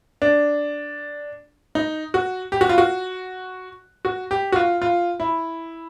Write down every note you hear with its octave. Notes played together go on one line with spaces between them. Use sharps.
D4
D#4
F#4
G4
F#4
F4
F#4
F#4
G4
F#4
F4
F4
E4